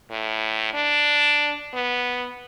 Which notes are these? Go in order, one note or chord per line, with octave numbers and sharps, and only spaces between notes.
A2
D4
B3